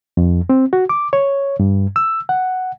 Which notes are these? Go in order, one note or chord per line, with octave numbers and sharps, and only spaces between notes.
F2
C4
F#4
D6
C#5
G2
E6
F#5